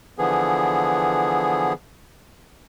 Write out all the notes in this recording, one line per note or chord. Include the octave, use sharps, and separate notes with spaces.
D3 E3 F3 B3 G#4